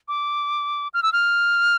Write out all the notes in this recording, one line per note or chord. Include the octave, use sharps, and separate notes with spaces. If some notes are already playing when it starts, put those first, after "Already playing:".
D6
F6
E6
F6